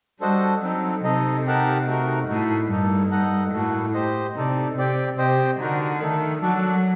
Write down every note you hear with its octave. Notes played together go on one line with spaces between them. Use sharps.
G3 D4 F#4 A4 C5 D#5
F#3 C4 D#4 A4
C3 D#4 A4 D#5
D#4 G4 A#4 F#5 A5
A3 D#4 F#4 A#4
A2 D#4 F#4 A4
G2 A#3 D#4 A4
D#4 A4 D#5 F#5
A2 A#3 F#4 A4
G4 C5 D#5
C3 D#4 A4 D5
C3 C4 G4 D5 G5
C3 G4 C5 D#5 G5
D3 D#4 F#4 A#4
D#3 A3 D#4 A4
F#3 D4 F#4 A4 D5